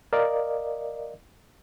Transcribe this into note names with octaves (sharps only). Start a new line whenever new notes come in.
A#4 D5 D#5 F5